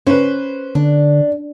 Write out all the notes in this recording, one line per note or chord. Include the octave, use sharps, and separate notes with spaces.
C#4 B4 C5
D3 D4